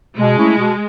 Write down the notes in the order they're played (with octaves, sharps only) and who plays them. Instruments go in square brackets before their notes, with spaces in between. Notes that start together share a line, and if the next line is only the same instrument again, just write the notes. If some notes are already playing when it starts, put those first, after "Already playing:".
[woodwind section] B2 [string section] G#3
[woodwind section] A3 C#4 E4
B2